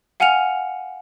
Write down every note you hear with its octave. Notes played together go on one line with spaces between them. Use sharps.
F5 F#5 G#5 F6 C#7 F7